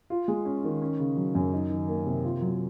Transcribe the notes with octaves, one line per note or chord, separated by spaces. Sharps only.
F4
G#3
C#4
D#3
C#4
C#3
F#3
F#2
D#4
D#3
A#3
C3
F4
F#3